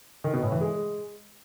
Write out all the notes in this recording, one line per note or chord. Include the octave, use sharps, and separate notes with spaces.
D#3
B2
A2
E3
G#3